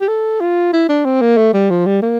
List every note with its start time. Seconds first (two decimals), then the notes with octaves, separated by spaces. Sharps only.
0.01 G4
0.08 A4
0.41 F4
0.73 E4
0.89 D4
1.05 C4
1.21 A#3
1.37 A3
1.54 G3
1.70 F3
1.86 G3
2.02 A#3